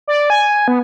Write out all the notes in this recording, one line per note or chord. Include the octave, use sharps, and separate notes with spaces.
D5
G#5
B3